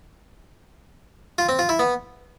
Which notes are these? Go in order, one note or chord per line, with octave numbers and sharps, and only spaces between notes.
F4
C4
F4
E4
B3